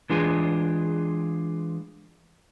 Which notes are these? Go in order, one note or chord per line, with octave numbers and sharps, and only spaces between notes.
E3 G#3 D4 F4 G#4